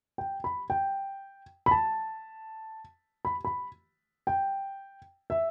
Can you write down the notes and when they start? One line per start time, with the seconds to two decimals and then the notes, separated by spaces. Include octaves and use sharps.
0.18 G5
0.44 B5
0.70 G5
1.66 B5
1.71 A5
3.25 B5
3.45 B5
4.27 G5
5.30 E5